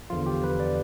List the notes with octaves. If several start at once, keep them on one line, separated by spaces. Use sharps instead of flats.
E2 D3 F3 F4
G4
B4
D5